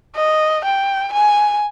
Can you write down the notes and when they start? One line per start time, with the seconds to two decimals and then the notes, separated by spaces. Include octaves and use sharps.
0.15 D#5
0.65 G5
1.13 G#5